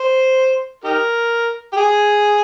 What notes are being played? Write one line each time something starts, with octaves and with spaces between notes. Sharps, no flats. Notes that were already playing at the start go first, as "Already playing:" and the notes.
Already playing: C5
D#4 G4 A#4
G4
G#4